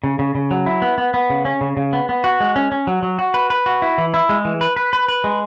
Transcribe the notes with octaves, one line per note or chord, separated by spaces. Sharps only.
C#3
C#3
C#3
F#3
E4
B3
B3
B3
C#3
C#4
C#3
C#3
B3
B3
F#4
G#3
C#4
C#4
F#3
F#3
F#4
B4
B4
F#4
E4
E3
E4
G#3
E3
B4
B4
B4
B4
G#3